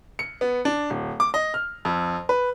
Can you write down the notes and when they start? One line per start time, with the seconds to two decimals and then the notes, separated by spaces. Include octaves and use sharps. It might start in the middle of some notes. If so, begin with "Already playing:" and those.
0.19 C#7
0.41 B3
0.65 D4
0.90 D1
1.20 D6
1.34 D#5
1.54 F6
1.85 F2
2.29 B4